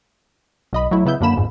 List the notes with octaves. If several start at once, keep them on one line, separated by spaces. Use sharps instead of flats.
B1 D#5 B5
F#3 A3 E4
C#3 B3 E4 G6
F#2 D3 A#3 B5 E7
G1 F2 G#2